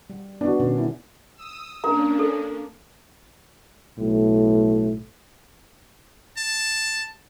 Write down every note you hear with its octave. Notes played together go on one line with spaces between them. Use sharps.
G3
B3 D4 F#4
B2 D#3 C#4
G3 E4
D#6 E6
A#3 C#4 D4 A#4 A#5
A4
B1 A2
A5